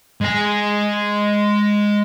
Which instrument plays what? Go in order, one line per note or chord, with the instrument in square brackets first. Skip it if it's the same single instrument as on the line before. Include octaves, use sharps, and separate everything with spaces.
[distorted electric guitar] G#3 G#5